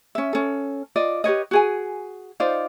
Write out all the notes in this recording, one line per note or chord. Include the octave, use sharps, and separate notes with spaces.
C#4 E5
C#4 A4
F4 D5 D#5
G4 B4 C#5 D#5
F#4 G#4 G#5
D#4 F4 C5 D5